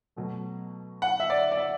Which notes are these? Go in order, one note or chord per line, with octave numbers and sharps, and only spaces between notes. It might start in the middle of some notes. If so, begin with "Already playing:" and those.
B2 F#3 A3
F#5
E5
D5
D5
E5